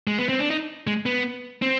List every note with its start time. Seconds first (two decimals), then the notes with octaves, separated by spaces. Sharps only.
0.07 G#3
0.18 B3
0.29 C4
0.39 D4
0.50 D#4
0.87 G#3
1.06 B3
1.62 C4